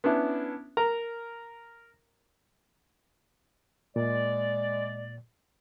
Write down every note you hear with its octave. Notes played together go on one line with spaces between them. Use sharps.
B3 C#4 D4 E4
A#4 A#5
A#2 G#3 D5